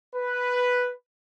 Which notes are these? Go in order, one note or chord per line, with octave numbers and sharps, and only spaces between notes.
B4